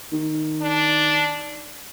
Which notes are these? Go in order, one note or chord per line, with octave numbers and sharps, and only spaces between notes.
D#3
D4